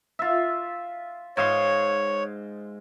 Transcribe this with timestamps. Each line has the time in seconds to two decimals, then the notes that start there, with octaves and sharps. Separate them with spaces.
0.19 F4 E5
1.37 G#2 C#5 F5 C6